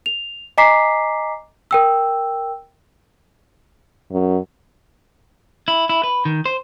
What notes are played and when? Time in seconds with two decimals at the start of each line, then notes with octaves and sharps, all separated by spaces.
0.06 F7
0.58 D#5 G#5 A#5 D6 B6 C7
1.71 A#4 G5 E6
4.12 F#2
5.68 E4
5.89 E4
6.03 B4
6.25 D#3
6.46 C5